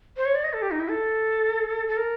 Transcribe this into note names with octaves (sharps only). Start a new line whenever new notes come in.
C5
C#5
D5
D#5
A4
G4
D#4
E4
A4
A4
A#4